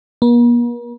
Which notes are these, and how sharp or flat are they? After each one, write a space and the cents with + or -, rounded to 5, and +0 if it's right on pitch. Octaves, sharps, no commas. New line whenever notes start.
A#3 +45